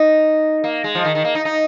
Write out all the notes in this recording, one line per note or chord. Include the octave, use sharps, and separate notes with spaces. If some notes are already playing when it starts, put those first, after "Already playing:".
Already playing: D#4
A#3
G#3
F3
D#3
D#3
A#3
D#4
D#4